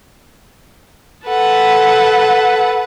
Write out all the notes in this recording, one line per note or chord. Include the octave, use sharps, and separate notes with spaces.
A4 B4 F#5